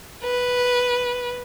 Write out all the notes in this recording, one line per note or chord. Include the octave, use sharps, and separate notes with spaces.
B4